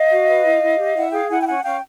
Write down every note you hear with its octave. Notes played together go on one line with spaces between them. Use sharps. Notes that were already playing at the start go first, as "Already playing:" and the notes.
Already playing: D#5 F5
F#4
B4
E4
E4
G4
E4 E5 F#5
G#4 F5 G5
E4 F#5 G#5
G5
C#4 F#5 G#5
C#4 F5 G5